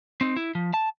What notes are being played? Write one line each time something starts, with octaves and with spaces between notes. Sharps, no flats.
C4 D#4
E4
F3
A5